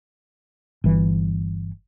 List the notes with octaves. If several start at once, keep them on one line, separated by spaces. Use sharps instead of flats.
G1 E3